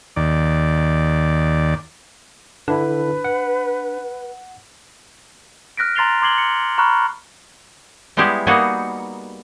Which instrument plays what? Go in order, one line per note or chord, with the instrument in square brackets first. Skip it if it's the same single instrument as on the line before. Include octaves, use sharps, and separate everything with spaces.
[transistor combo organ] D#2 D5
[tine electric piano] D3 E4 [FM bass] D4 [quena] B4
[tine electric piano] F#5
[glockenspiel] F6 F#6 A#6 B6 D7
A#5 C6 A6 C7 F7 G7
C6 D6 G#6 C7 F#7 G7
C#7
A#5 B5 C#6 F6 F#6
[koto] G3 G#3 B3 E4 G4
G3 A#3 B3 D#4 F#4 G#4